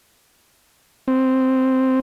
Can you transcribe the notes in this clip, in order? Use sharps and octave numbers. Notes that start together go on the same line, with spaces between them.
C4